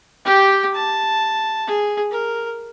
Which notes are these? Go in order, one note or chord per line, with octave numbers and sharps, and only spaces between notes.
G4 G5
A5
G#4
A#4